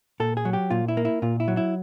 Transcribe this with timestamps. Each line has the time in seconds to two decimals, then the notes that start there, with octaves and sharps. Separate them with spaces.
0.20 A#2 A4
0.37 G#4
0.45 F#3
0.53 G4
0.70 A#2 F4
0.88 E4
0.97 A#3
1.05 E4
1.22 A#2 F4
1.40 E4
1.48 F#3
1.57 E4